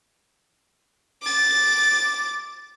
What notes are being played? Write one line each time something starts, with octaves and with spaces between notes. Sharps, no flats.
D6 A6